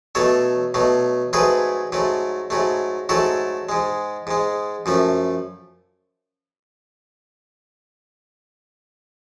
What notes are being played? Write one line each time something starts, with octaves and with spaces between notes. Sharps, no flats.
B2 F#3 A3 A4 C#5
B2 F#3 A3
G#2 F#3 A3 G#4 B4
G#2 F#3 A3
G#2 F#3 A3
G#2 F#3 A3 F#4 A4
G#2 G#3
G#2 G#3
F#2 F3 A3